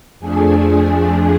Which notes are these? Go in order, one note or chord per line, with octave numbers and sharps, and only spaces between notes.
F2 F3 A3 D4 G#4 G#5